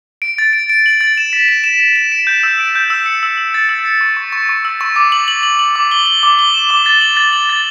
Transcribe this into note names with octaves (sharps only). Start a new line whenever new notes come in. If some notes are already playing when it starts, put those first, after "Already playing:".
D7
A6
D7
D7
F#7
A6
E7
B6
E7
E7
E7
E7
D7
G6
E6
D7
G6
E6
C#7
E6
E6
A6
E6
C#7
C#6
C#6
C#6
C#6
E6
C#6
D6
F#7
F#7
F#7
F#7
D6
G7
G7
D6
G7
E7
D6
A6
F#7
A6
F#7
A6